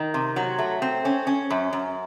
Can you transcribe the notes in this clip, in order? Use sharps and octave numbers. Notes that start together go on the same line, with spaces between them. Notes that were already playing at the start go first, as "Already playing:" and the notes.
Already playing: D#3
C3
F#3
A3
C4
C#4
C#4
F#2
F#2